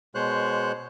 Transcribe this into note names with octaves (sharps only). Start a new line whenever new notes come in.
B2 G#3 C5 C#5 F#6